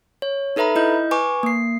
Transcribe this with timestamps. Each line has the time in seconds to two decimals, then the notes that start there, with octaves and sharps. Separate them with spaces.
0.22 C#5
0.56 D#4 A4 B4 E5 A#5 B5
0.75 E4 D#5 G6
1.11 B4 G#5 C#6 D6
1.43 A#3 C7